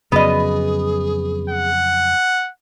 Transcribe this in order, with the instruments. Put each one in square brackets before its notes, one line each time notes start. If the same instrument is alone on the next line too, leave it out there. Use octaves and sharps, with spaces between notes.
[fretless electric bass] F2 C#3 F#3 [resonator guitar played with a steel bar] B3 D#5 [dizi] G#4
[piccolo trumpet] F#5